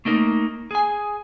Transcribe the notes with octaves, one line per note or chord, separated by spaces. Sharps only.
A3 A#3 D#4 A#4
G#4 G#5